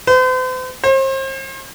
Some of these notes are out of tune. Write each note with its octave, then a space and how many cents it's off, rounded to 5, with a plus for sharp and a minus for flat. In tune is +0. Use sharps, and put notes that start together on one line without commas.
C5 -45
C5 +35